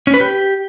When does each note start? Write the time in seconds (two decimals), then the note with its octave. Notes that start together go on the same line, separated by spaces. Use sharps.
0.07 C#4
0.14 B4
0.20 G4